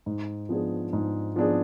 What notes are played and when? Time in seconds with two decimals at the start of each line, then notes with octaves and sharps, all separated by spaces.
0.06 G#2
0.49 F3 B3 D4 G#4
0.93 G#2
1.36 F3 B3 D4 G#4